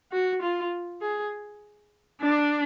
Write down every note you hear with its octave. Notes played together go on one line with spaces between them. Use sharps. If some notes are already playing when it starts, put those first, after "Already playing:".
F#4
F4
G#4
D4